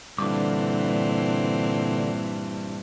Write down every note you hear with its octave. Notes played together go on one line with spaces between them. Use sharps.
G2 A#2 D3 E3 C4 D6